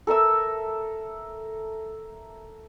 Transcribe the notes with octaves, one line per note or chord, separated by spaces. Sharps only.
A4 A#4 E5 E6